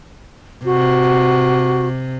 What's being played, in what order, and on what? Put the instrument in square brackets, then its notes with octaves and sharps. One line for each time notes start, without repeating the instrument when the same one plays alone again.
[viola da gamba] C3 [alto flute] F#4